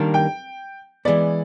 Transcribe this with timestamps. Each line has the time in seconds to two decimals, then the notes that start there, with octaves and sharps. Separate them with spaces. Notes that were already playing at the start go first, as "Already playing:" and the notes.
Already playing: D#3 G3 A#3 D4
0.14 G5
1.05 E3 G#3 B3 D5